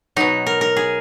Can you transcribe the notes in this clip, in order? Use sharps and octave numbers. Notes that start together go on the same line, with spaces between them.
B2 F#3 D#4
A#4
A#4
G#4